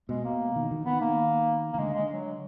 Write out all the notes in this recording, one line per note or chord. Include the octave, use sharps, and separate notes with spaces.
B2 G#3
A#3
D#3
D#3
D#3 B3
A#3
D#3 A#3
D3 G#3
G#3
F#3